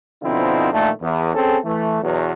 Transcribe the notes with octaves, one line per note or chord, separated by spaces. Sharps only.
B2 D3 F3 C4 D#4 E4
A#1 A#2 D#3 A3
E2
C4 C#4 G#4 A4
E3 A3
E2 B2 F#3